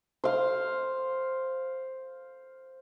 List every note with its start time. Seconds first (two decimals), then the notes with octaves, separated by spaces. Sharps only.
0.24 C5 F5